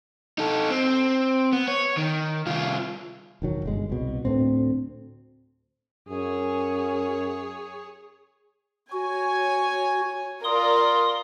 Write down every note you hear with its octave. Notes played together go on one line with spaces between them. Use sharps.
D#4 A4
C4
B3
C#5
D#3
C2 F4
E1 D#3 F#3
G1 G#3
C2 B2
D2 A2 C4
F#2 G#4 C#5
F#4 C#5 G#5
F4 A#4 D5 C6 D#6